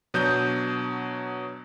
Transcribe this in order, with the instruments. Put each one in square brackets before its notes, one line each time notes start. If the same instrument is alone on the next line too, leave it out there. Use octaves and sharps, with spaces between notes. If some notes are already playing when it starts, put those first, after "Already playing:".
[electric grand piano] B2 F#3 D4 D#6 G6